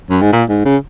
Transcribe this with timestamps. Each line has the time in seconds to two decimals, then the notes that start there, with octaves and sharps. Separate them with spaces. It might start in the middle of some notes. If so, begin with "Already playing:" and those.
0.10 F#2
0.21 G#2
0.32 A#2
0.49 G#2
0.65 C#3